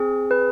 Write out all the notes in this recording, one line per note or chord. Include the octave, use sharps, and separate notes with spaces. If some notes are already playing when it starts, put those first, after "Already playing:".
Already playing: C4 G#4
B4